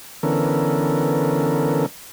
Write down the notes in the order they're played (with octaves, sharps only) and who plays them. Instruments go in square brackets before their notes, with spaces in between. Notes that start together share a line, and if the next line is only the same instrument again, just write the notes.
[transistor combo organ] D3 E3 B3 C#4 A4 A#4